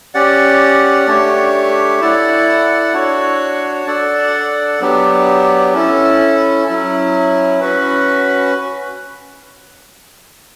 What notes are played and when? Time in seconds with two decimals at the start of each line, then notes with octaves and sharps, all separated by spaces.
0.14 C#4 G4 D5 F#5
1.07 A3 D4 G4 C#5
2.01 E4 A4 D5 F#5
2.94 D4 F#4 C#5
3.87 D4 A4 D5 F#5
4.80 F#3 B3 D4 G4
5.74 C#4 E4 A4
6.67 F#3 C#4 E4
7.61 C#4 F#4 B4